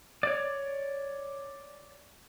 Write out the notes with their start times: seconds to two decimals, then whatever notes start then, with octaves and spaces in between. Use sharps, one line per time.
0.23 C#5 D5